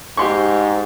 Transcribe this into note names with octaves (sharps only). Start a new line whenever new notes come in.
G#2 G4 C6 C#6